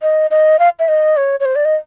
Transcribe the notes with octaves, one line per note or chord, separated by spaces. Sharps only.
D#5
D#5
F5
E5
D#5
C#5
C#5
C5
D5
D#5